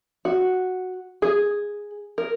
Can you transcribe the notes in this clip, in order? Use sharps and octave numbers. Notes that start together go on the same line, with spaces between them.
F#4
G#4
A#4